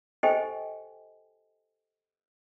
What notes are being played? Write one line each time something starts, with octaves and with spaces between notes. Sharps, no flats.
G4 A4 C5 D#5 G5 G#5